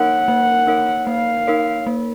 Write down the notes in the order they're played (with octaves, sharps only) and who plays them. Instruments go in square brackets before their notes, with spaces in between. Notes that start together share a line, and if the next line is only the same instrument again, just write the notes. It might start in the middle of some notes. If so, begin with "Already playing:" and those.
Already playing: [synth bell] A#3 D#4 A#4 C#5 [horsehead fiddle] F#5
[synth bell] A#3
D#4 A#4 C#5
[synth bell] A#3 [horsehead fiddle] F5
[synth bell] D#4 A#4 C#5
A#3